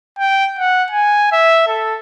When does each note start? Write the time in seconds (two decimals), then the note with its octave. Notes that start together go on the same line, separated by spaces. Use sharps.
0.19 G5
0.59 F#5
0.91 G#5
1.32 E5
1.67 A4